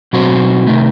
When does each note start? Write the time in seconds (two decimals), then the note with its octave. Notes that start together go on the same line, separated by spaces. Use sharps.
0.13 B2 F#3 C4 F#4 C5
0.67 C3 D#3 A3